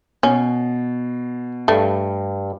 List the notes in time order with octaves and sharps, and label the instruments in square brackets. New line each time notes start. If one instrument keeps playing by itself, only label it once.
[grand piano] B2 [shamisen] C#4
[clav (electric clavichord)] G2 [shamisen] A3